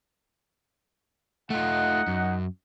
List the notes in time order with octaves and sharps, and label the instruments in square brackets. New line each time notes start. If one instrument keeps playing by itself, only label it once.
[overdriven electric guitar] A3 F4 [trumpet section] D#4 D#5 F#5
[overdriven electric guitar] F#2